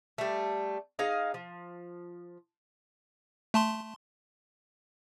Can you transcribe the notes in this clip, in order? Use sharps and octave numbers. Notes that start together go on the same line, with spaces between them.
G3 A3
D#4 G#4 D#5 F5
F3
A3 A5 C6